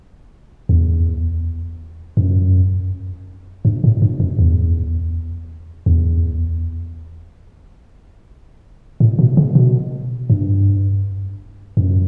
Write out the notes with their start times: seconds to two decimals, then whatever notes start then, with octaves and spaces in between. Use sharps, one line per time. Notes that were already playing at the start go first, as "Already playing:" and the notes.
0.69 E2
2.17 F#2
3.65 G2
3.84 A2
4.02 G2
4.20 F#2
4.39 E2
5.86 E2
9.00 A2
9.19 B2
9.37 C#3
9.55 B2
10.30 G2
11.77 F#2